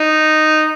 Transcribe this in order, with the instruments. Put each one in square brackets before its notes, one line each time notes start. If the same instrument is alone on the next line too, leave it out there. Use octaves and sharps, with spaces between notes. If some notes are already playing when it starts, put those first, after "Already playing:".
Already playing: [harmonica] D#4